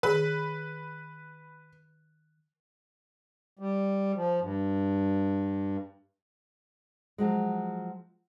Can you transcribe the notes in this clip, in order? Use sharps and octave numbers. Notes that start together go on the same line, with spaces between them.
D#3 G#4 B4
G3
F3
G2
F3 F#3 G#3